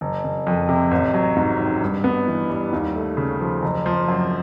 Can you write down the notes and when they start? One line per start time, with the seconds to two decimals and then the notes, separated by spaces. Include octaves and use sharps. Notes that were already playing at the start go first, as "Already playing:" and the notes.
0.01 F#1
0.24 F#1
0.47 F2
0.69 C3
0.91 A1
1.14 F#3
1.36 G#2
1.59 D#3
1.82 G2
2.04 B3
2.28 E3
2.50 G3
2.73 D#2
2.95 A3
3.17 C#3
3.40 F3
3.62 F#1
3.86 F3
4.08 F#2